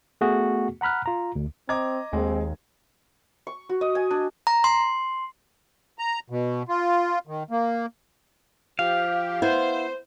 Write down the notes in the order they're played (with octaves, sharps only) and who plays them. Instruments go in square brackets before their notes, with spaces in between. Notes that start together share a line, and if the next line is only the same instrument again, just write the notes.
[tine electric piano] A3 B3 F#4 G#4
F#5 A#5 B5 F6 F#6
F4 A#5
D2
[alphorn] C4 [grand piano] D#5 A#5 D6 [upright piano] G#6
[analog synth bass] D#2 [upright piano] G#3 G#4 [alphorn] C4
[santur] C#6
F#4
D#5
G#5
D4
[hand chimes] A#5
C6
[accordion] A#5
B2
F4
D#3
A#3
[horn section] F3 G4 [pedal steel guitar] F5
[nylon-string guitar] B3 E4 [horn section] C5